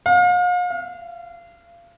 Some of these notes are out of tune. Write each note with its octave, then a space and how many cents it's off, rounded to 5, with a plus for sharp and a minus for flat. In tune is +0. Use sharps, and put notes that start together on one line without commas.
F5 +40
F5 -30